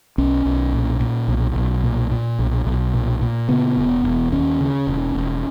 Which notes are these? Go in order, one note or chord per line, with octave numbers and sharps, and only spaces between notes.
B1 C#4
B1
A#2
A#2
B1
B1
A#2
A#2
B1
B1
A#2
A#2
C#3 B3
E1
E1
D#2 C#4
C#3
E1
E1